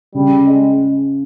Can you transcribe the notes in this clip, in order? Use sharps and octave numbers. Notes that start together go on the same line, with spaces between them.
C#3 G3
G#3